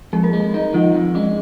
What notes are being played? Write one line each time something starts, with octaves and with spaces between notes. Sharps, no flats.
F2 G#3 G#4
A#3 A#4
G#3
D#4
D#3 F3 F4
F2
G#3 C#4